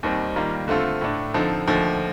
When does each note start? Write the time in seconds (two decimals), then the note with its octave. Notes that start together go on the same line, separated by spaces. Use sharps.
0.03 D#2 D#3 G3 C4
0.36 D#3 G3 A#3 F4
0.68 D3 A3 C4 F4 A4
1.01 A2 A3 D4
1.34 D3 F3 C4 D#4 A4
1.68 D#2 D3 F3 A3